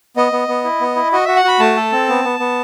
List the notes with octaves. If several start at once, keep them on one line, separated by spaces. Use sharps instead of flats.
B3 D#5
B3
B3
E4
B3
E4
F#4 D#5
F#4 E5
F#5
F#4 B5
A3 A5
A4
C4
B3
B3
B3